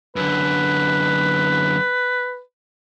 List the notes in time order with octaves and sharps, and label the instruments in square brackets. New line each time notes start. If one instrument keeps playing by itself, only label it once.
[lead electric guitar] F#2 D3 [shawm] B4